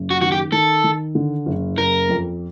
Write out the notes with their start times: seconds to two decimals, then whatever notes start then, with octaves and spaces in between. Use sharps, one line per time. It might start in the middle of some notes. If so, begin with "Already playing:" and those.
Already playing: F#1
0.11 F#4
0.21 D#3 F#4
0.32 G4
0.52 D#3 A4
0.84 D#3
1.15 D3
1.46 F#1
1.78 F#1 A#4
2.09 F2